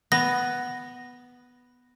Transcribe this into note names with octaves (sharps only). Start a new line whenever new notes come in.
B3 A#6